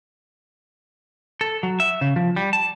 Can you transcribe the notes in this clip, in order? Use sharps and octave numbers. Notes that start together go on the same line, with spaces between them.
A4
F#3
E5
C#3
F3
G3
A5